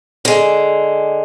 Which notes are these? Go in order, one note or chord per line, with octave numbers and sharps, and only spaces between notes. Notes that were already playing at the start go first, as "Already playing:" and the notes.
D3 G#3